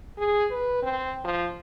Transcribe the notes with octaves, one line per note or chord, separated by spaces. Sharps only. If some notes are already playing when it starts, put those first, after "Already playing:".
G#4
B4
C4
F3